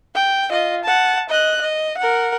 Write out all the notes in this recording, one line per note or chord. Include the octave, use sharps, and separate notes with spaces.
G5
F4 D#5
F#5 A5
D#5 F#6
D#5
A#4 F#5